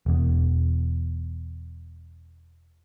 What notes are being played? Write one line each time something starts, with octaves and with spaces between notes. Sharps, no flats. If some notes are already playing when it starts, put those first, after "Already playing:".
E1 E2